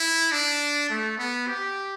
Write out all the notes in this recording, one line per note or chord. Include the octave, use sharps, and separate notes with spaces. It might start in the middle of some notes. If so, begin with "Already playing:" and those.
Already playing: E4
D4
A3
B3
G4